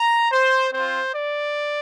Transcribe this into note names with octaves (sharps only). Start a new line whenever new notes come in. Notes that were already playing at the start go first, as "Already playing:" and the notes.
Already playing: A#5
C5
C4 F4 C5
D5